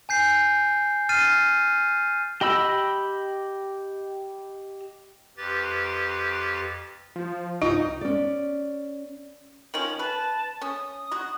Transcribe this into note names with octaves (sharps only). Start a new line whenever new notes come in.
G#5 G6 C7
F6 A6 C7 D#7
G4 D#5 B5 E6
F2 G4 B4 A6
F3
C2 G2 D#4 F4
C#4 D5
D#3 F3 C#4 F#7
B4 A5
C#4 D#6
F#3 F#4